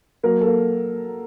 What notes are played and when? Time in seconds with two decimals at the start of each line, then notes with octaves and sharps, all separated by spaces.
0.23 F#3 A#3 A#4
0.41 A4
0.47 A#3